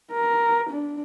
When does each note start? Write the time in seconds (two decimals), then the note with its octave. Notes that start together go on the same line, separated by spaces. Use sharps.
0.12 A#4
0.70 D4